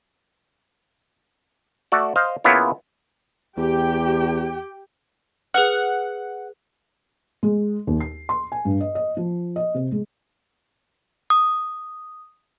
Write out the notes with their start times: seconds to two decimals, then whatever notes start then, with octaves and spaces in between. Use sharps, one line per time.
1.92 A3 F#4 A4 D5
2.16 C5 D#5 F5
2.44 C#3 A#3 B3 E4 F4 C#5
3.57 E2 G4 G5
5.54 G#4 B4 F#5 F6
7.43 G#3
7.87 D#2
8.00 C7
8.29 C6
8.52 G#5
8.65 G2
8.81 D#5
8.95 D#5
9.17 F3
9.56 D#5
9.74 C3
9.92 G#3
11.30 D#6